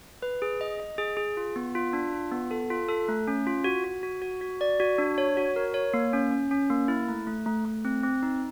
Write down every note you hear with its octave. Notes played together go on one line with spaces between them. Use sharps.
B4
G#4
D#5
D#5
G#4
G#4
F4
B3
F4
D4
F4
B3
A4
F4
A4
A3
C#4
F4
F#4
F#4
F#4
F#4
F#4
D5
F#4
D4
C#5
F#4
A#4
C#5
A#3
C#4
C#4
C#4
A#3
E4
A3
A3
A3
A3
C4
C4
D#4